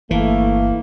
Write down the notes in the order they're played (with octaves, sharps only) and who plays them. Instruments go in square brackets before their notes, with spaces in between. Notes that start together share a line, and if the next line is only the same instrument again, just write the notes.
[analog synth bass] G1 [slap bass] E3 [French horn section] A3 [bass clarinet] A#3